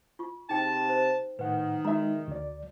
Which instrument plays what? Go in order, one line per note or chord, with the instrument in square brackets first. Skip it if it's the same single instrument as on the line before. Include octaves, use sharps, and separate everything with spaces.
[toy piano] F4 C#6
[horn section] C3 A5 [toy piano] D#4 G#4 G5
[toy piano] C5
[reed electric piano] A2 F#5 [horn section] D#3 [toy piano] B4
[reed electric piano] G#3 D#4 E5 [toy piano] F#4 A#5
[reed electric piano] D2 D5